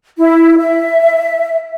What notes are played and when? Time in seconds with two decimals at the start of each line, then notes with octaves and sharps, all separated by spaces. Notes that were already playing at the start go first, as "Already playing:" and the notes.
0.18 E4
0.58 E5